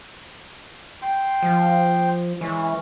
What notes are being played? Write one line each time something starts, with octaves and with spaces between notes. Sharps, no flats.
G5 C6
F3
E3 G#3 C#4